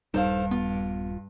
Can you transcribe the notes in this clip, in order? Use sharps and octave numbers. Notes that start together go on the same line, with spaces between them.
D#1 G2 G3 D#4 A4 C5 F5
B3 F4